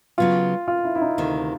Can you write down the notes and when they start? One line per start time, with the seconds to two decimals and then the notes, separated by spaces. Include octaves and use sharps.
0.18 C#3 F#3 B3 F4
0.68 F4
0.84 E4
0.95 E4
1.01 D#4
1.18 D2 C3 D#3